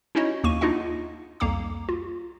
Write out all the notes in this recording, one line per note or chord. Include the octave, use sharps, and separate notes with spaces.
C#4 D#4 E4 F#4 C#5 D#5
D#2 A#3 C#6 D#7
D4 D#4 F4 G#4 D#5 F#5
C2 F2 A#3 F5 A#5 D6
F4